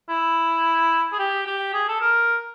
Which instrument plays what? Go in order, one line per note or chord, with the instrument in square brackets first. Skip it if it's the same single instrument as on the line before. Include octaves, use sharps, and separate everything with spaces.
[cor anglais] E4
G#4
G4
G4
G#4
A4
A#4